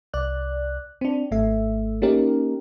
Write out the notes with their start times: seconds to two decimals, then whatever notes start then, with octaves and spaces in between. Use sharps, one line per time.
0.14 C2 D5 F#6
1.01 C4 D4
1.31 G#1 A3 E5
2.02 A#3 C#4 D#4 G4 A#4